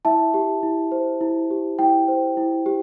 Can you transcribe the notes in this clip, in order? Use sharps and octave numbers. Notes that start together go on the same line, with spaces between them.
E4 E5 A5
G4
E4
C5
E4
G4
E4 G5
C5
E4
G4